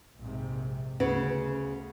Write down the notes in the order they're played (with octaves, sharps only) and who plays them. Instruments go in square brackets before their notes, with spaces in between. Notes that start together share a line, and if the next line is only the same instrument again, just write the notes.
[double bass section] A#1 G#2 C3
[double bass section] D2 [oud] C#3 [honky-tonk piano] B3